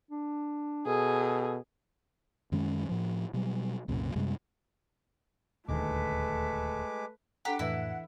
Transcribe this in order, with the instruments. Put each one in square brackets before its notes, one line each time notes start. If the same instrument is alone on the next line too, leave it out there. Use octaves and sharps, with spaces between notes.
[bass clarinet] D4
[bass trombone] B2 [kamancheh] G#4 [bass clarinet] A4
[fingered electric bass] F#2 D#3 G#3 C#4
A2 F3
B2 F#3 G3
C2 F#2 A#2 C#3
F#2 C3 G3 G#3
[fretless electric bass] D#1 D2 D#3 [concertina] G#3 D6 [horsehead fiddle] A3 B4
[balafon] D4 A4 A#5 [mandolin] G4 [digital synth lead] F#5
[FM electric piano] F2 A2 E5 [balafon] E3 B4 [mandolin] E4